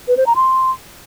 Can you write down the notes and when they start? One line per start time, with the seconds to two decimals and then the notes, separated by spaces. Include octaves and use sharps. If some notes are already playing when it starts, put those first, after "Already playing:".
0.08 B4
0.17 C5
0.26 A#5
0.36 C6